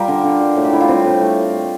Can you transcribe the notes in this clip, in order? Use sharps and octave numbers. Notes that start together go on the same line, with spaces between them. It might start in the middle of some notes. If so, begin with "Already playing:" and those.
Already playing: G3 F4 G4 A#4
D3
D3
G3
A2
G4
A2 E4
F4
G3 C4
A2
A3